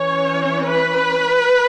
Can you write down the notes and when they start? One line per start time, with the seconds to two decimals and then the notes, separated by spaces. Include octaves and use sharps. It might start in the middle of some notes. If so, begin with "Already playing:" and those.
Already playing: E3 C#4 C#5
0.67 B4